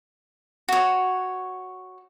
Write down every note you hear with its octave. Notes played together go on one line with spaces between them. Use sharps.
F#4 C#5